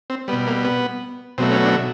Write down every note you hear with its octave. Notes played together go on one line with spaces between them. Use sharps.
C4
B2 G3 B3
A#3
B3
B2 F#3 A3 C4
C#4
D4